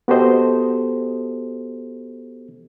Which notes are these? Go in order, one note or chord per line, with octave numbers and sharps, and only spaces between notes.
B3 F#4 G4 A4 C5 D#5